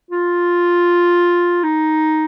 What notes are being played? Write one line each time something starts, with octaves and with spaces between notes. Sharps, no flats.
F4
D#4